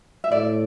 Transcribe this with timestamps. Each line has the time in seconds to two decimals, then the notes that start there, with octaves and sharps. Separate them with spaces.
0.24 E5
0.31 A2 D5